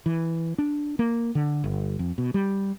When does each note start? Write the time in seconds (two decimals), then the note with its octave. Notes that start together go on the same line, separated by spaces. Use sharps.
0.06 E3
0.58 D4
0.99 A#3
1.35 D3
1.64 G1
1.99 F2
2.18 B2
2.34 G3